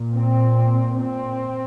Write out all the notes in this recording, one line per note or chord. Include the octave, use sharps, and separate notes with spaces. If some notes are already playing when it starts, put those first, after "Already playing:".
Already playing: A#2
C4
C4